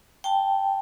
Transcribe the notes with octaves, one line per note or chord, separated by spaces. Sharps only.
G5 A5